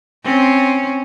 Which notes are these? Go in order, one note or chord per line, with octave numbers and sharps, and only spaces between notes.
C4 C#4